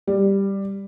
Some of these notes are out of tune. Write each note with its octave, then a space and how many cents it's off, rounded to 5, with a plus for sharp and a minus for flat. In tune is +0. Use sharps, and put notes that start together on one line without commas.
G3 +5